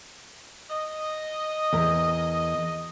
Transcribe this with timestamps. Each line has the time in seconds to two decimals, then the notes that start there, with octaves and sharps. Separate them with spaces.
0.70 D#5
1.73 E2 A#4